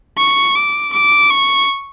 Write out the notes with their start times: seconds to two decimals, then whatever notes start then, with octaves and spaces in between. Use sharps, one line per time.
0.18 C#6
0.56 D6
0.93 D6
1.30 C#6